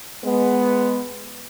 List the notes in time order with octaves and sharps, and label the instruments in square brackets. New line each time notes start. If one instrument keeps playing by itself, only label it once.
[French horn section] G#3 B3